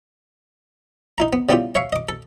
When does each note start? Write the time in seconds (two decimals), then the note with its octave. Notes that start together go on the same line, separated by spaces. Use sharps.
1.18 D#4 E4 A#5
1.33 B3
1.49 C#3 G3 B3 E4 F4 G4
1.75 C#5 E5 F5 C#6
1.93 D#5 D6
2.09 A4